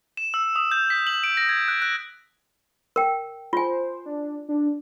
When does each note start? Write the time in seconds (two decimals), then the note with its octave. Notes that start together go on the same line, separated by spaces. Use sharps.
0.17 E7
0.34 E6
0.56 D#6
0.71 G6
0.90 B6
1.07 F#7
1.24 D7
1.37 A#6
1.49 G#6
1.68 F#6
1.82 F#6
2.96 A#4 G5
3.53 F4 C5 G#5
4.06 D4
4.49 D4